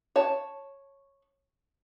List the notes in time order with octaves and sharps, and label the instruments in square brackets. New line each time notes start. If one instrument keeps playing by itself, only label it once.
[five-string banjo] C#5 A5